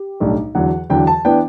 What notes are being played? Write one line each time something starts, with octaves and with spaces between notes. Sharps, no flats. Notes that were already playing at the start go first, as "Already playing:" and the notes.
Already playing: G4
B1 A2 G3 D4
E2 D3 F#3 F#5
E2 D3 F#3 G5
A5
E3 B3 D4 G5